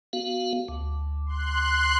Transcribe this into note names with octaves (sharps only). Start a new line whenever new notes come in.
B3 F#4 F5
D2
C6 F#6